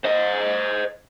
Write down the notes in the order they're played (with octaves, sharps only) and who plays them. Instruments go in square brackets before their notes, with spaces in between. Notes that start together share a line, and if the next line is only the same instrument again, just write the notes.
[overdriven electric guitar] C5 D#5